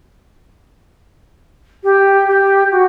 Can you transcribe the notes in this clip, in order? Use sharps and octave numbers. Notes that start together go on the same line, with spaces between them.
G4
G4
F#4